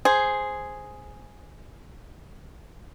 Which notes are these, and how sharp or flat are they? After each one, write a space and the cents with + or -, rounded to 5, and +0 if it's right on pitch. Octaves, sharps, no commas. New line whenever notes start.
G#4 +0 C5 +0